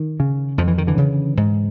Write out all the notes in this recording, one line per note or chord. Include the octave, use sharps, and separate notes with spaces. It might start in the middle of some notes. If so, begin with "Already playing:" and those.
Already playing: D#3
C#3
F2 F3
E3
D#3
D3 E3
C#3
G#2